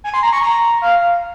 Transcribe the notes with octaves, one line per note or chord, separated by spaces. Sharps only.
G#5
C6
A#5
C#6
A#5
F5